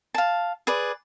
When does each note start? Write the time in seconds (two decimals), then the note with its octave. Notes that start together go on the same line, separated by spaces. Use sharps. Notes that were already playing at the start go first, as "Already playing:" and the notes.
0.15 F5 A5
0.67 G#4 B4 D5